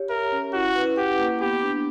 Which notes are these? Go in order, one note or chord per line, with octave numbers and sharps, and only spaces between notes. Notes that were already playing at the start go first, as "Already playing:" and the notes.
Already playing: G4 C#5
A#4 E5
C#4
E4 F#4
B4
G4 F#5
A#3
B3 G4
D4